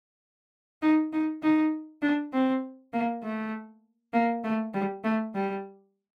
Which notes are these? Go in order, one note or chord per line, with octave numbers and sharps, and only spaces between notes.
D#4
D#4
D#4
D4
C4
A#3
A3
A#3
A3
G3
A3
G3